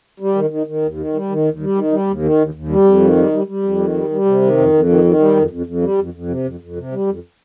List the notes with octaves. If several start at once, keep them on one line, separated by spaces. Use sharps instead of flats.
G3
D#3
D#3
D#3
D#2
D#3
G3
D#3
D#2
G3
D#3
G3
D#2
D#3
D#2
D#2
G3
F2
D#3
G3
G3
G3
F2
D#3
G3
G3
C3
D#3
F2
F2
D#3
D#3
G3
F2
F2
F2
G3
F2
F2
C3
F2
F2
C3
G3
F2